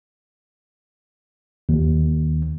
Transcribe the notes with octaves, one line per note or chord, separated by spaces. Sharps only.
D#2